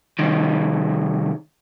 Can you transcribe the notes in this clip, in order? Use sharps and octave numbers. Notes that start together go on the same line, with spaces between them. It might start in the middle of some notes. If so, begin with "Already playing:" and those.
C2 D#3